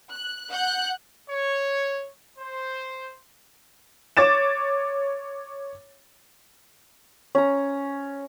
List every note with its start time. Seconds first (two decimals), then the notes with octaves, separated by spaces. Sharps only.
0.11 F#6
0.51 F#5 F#6 G6
1.29 C#5
2.39 C5
4.17 C#5 D6 A6 E7
7.35 C#4 A#5